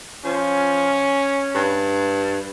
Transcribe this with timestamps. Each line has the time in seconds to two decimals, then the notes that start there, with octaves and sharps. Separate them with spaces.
0.25 F3 C#4
1.55 G2